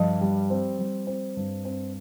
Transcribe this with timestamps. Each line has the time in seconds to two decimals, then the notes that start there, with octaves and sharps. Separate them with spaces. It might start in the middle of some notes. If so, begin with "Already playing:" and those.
Already playing: G2 F3
0.21 G3
0.50 C4
0.79 G3
1.07 C4
1.37 G2
1.65 C4